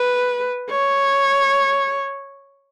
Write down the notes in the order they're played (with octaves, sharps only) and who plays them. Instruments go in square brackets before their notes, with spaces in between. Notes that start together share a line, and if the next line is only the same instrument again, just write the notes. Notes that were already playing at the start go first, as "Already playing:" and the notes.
Already playing: [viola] B4
C#5